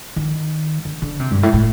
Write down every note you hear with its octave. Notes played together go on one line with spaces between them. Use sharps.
D#3
D3
D3
C3
G2
A2
A2